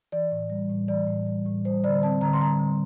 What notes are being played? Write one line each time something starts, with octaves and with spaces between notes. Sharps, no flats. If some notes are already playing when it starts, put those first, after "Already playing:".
E3 D5
A2
G3
A2
E3 D5
A2
G3
A2
G3 C5
D3 D5
C4 A5
D3 A#5
C6
G3 A#5
D3